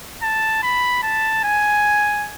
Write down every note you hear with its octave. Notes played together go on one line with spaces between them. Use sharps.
A5
B5
A5
G#5